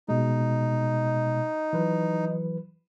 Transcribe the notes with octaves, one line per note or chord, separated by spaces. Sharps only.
B2 G#3 D#4
E3 F#3 B4